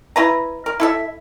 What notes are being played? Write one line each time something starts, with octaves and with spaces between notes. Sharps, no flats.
E4 B4 A#5
A#4
E4 A4 E5